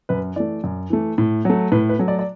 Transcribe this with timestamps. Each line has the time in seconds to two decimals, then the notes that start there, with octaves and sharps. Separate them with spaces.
0.09 F#2 B4
0.36 E3 A3 D5
0.64 F#2
0.90 E3 A3
1.18 A2
1.45 F#3 A3
1.72 A2 B4
1.89 B4
1.99 F#3 A3
2.08 D5
2.19 D5